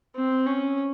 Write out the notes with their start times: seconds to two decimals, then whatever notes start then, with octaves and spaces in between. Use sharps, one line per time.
0.15 C4
0.46 C#4